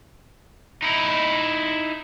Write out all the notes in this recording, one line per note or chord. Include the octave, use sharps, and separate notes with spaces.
D#4 E4